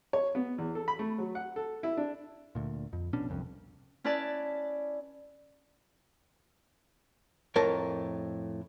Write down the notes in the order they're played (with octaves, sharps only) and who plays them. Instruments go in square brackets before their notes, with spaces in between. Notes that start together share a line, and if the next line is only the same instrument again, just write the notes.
[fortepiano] C#5
B3
E2
A4
B5
A3
F#3
F#5
A4
E4
D4
[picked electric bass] D2 A#2
F2
A#1 B2 C#4 D4
F#1 C2 F2
[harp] C#4 E4 B4 D5 A5
[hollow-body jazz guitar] F2 A2 A#4 A5